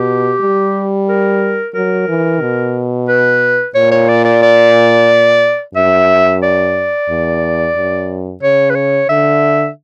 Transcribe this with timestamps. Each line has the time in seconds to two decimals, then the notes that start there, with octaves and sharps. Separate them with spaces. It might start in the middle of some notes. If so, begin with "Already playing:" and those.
Already playing: B2 G4
0.41 G3
1.08 A#4
1.74 F#3 A#4
2.08 E3
2.41 B2
3.08 B4
3.75 A#2 C#5
3.91 C#5
4.08 D5
4.25 D5
4.42 D5
5.75 F#2 E5
6.43 D5
7.09 E2
7.76 F#2
8.42 C#3 C#5
8.70 B4
8.75 C#5
9.09 D3 E5